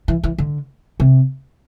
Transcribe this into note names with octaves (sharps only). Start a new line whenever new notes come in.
E3
E3
D3
C3